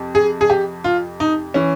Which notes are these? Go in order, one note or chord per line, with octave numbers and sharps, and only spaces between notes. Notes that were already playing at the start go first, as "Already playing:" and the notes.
Already playing: F2 C3
G#4
G#4
G4
F4
D#4
E3 C#4